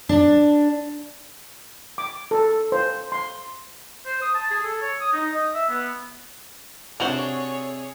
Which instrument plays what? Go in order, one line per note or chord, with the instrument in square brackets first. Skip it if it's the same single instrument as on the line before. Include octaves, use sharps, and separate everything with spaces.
[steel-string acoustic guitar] D4
[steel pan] D6
A4
C5
C6
[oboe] C5
D#6
A5
G#4
A4
C#5
D#6
D#4
D#5
E5
B3
[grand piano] C3 F7 F#7 [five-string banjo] D4 F#4 C5 [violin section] G#4 C#5